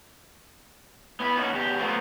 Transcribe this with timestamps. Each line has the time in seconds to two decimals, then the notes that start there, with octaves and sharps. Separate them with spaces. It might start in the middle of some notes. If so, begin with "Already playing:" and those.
1.20 B3 E4 B4
1.37 A#3 C#4 D#4 F#4
1.53 E2 G4
1.79 F#3 A3 B3 C4 F4